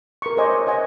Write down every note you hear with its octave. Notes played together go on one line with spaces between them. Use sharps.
A#4 C#6
C5 C#5 D#5 G#5 D6
D#5 F#5 G#5